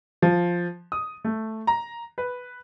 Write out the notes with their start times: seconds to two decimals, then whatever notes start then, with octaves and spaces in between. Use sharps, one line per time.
0.22 F3
0.92 D#6
1.24 A3
1.67 A#5
2.18 B4